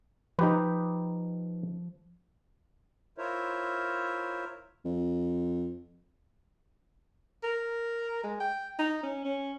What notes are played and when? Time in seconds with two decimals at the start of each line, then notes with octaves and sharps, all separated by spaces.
0.39 F3 D#4 G4 B4
3.18 E4 F4 A#4 C5 C#5 E5
4.85 F2
7.43 A#4
8.24 G#3
8.40 G5
8.79 D#4
9.03 C#4
9.25 C#4